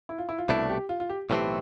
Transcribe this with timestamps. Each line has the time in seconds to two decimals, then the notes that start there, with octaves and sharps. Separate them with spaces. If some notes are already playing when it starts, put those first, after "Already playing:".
0.09 E4
0.18 F4
0.29 E4
0.38 F4
0.48 C2 B2 A3 D4 E4
0.70 G4
0.89 F4
1.00 F4
1.10 G4
1.30 B1 A2 E3 A3 C4 G4